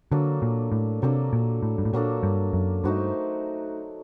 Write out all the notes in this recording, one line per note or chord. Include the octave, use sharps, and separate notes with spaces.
D3 F#3 A#3 D4 A4
A#2
A2
C3 F#3 A#3 D4 A4
A#2
A2
G2
A2
A#2 F#3 A#3 D4 A4
G2
F#2
G2 A3 D#4 F#4 C5